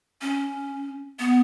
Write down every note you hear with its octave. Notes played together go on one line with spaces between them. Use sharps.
C#4
B3